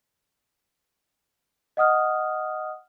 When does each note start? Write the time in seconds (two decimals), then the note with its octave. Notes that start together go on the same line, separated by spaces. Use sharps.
1.77 D#5 F#5 D#6 F6